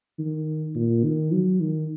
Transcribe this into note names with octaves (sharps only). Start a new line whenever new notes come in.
D#3
A#2
D#3
F#3
D#3